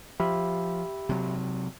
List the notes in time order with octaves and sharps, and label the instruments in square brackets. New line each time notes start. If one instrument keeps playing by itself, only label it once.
[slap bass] F3 [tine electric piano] G4 E5 B5
[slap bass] C3 F#3